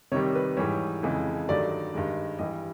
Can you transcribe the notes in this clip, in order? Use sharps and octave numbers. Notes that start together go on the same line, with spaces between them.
C3 D#3 G3 C#5
B4
G#2 E3 G3 C#5
F2 C#3 E3 G#3
G2 D#3 F#3 A3 D5
G2 D#3 G#3
G2 E3 G3 D#5